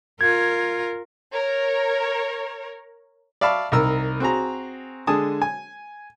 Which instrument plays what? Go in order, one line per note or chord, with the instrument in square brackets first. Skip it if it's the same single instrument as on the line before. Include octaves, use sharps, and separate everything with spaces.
[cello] F4 A#4 [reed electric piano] G#6
[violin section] A#4 C#5
[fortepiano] D5 E5 F5 A5 B5 C#6
C2 D#4 A#4 E6
C4 F#4 G#4 A#5
D3 G#3 G#5 A5 D#6
G#5